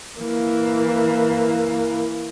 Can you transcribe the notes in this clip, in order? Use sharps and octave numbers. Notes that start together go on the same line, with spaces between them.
E3 A#3